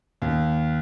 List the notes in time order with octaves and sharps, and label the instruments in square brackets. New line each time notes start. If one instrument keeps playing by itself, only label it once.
[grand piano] D#2